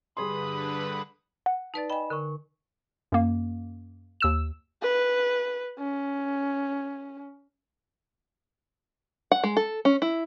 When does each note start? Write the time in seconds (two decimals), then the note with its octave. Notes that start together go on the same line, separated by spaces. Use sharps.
0.17 G2 D3 G3 G#4 B4 B5 C6 D#6
1.46 F#5
1.74 D#4 B4 D5 A5 A6
1.90 D#5 G5 G#5 B5 E7
2.10 D3 A#4 C#6
3.12 F#2 A#3
4.20 D#2 E6 E7
4.82 B4
5.79 C#4
9.31 F#5
9.43 G#3
9.57 A4
9.85 C#4
10.02 E4